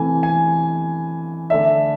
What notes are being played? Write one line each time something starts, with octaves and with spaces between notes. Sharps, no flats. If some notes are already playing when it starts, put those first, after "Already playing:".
Already playing: C3 E3 A3 G#5
G#5
D3 A3 D4 E5